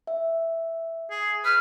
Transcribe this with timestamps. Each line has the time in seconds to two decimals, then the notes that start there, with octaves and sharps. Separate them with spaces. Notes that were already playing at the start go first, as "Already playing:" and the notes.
0.07 E5
1.10 G#4
1.45 B4 F6